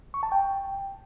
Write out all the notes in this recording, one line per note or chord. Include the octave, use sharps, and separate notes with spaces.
C#6
A5
G5